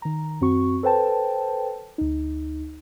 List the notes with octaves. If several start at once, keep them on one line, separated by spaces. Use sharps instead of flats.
D#3 A#5
F#2 C4 F#4 C#6
A4 B4 C5 G5 A5
D2 D#4